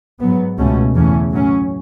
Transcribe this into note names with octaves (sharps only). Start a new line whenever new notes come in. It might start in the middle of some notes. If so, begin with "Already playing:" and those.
G#2 F#3 B3
C#2 B2 A3 C#4
E2 C#3 E3 A3 C#4
A2 F#3 C#4